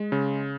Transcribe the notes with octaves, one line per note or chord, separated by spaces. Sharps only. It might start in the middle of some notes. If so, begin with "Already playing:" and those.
Already playing: G#3
C#3